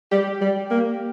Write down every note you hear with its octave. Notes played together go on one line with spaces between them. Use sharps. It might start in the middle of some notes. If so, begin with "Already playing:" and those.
G3 G4
G3
A#3